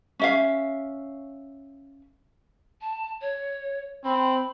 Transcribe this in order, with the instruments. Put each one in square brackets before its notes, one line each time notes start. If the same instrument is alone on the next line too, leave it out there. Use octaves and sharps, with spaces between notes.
[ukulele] C#4 E5 F5
[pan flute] A5
C#5
[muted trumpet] C4 [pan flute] B5